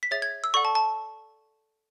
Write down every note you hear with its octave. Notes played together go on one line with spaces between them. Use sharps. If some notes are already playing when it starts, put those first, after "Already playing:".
B6
G#4 C#5 E5 A6
G#6
E6
A4 D5 F#5 C#6
A5
A5